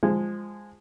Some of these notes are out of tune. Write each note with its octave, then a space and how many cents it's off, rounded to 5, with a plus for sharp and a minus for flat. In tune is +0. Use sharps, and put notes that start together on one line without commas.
F3 +0 G#3 -15